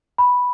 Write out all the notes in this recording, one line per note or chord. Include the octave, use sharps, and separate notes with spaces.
B5